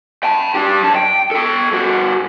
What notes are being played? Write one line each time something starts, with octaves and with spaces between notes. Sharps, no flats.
G5 A5
D4 G4
F#2 A5
G5
A4 G5
G2 F#4